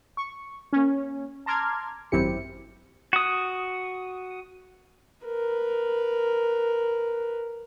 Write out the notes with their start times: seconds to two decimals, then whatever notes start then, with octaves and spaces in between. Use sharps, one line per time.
0.17 C#6
0.73 A#3 C#4
1.46 A5 A#5 C6 D6 F6 G#6
2.12 G#1 F#2 C4 E4 G4 C#7
3.13 F#4 D#6
5.25 A#4 B4